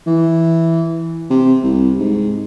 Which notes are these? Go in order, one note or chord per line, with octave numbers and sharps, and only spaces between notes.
E3
C3
C2
G#2